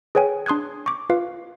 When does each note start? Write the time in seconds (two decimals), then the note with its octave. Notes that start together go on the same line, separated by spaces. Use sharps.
0.15 G#4 B4 C#5 G5 G#5
0.46 D4 C6 D#6 F#6 G#6
0.86 C#6 D6
1.10 F4 B4 F5